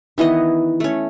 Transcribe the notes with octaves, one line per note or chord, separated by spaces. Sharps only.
D#3 E3 B3 D#5
A3 C#4